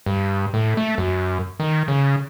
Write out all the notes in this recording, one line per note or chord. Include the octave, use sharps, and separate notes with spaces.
G2
A2
A3
F#2
D#3
C#3